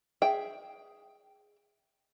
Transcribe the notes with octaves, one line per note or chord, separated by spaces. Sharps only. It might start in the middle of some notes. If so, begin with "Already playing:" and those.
G#4 E5 G5